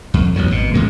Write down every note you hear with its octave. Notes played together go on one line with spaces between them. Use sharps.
F2
A1 F#2 B2 F#3
G#1 B2
A1 A2 G#3